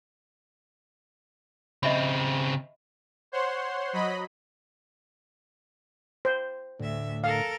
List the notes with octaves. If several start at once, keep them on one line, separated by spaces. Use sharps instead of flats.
C#3 C4 D#5 E5 B5
C5 C#5 F#5 C6
F#3 D#5 B5
C5
D2 A2 D3 E5
A4 A#4 F5